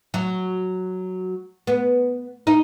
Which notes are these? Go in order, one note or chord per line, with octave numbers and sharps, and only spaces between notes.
F#3
B3
D#4